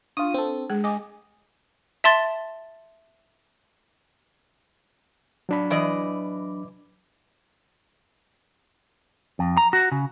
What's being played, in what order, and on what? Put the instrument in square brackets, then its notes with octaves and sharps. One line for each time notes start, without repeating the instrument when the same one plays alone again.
[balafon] D4 [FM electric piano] F4 D#6
[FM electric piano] C4 A4
[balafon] G#3 G#4
[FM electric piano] D#5 [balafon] G#5 D6
[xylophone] E5 A5 C6 A6
[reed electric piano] F#3 D4 B5
[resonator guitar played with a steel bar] E3 D5 D#5
[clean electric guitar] F2
A#5
F#4
C#3